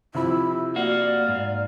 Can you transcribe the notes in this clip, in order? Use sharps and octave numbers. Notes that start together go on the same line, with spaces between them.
C3 F3 E4 B5
A#3 F#4 D5 F5
G#2